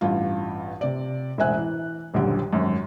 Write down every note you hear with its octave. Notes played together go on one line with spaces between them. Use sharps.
A1 G2 F4
C3 D5
E1 A1 C5 E5 G#5 F#6
E3
D#1 A#1 F#2 D3 G4
G#1 F#2